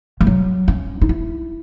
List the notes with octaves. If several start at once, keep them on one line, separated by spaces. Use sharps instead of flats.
E3
F#3
C#4
D#4
E4